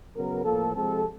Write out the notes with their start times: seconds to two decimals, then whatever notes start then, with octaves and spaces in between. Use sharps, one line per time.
0.16 C#3 F#3 B3 A#4
0.45 A2 F3 A#3 A4
0.75 C3 F3 G#3 C4 A4